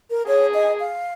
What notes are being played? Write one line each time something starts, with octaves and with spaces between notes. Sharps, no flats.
A#4
G#4 C#5
D#5
F5